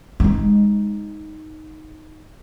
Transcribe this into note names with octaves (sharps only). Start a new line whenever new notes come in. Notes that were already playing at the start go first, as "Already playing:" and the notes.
G#3 D#4